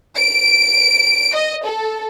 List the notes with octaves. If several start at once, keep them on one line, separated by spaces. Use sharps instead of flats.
D7
D#5
A4